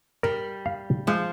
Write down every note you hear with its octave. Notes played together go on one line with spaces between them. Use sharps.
G3 A#4
F5
F3 G#3